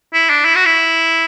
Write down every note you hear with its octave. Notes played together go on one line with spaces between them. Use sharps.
E4
D4
E4
F#4
E4